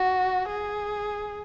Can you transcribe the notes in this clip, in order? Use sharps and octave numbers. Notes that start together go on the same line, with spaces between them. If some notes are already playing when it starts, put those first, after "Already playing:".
Already playing: F#4
G#4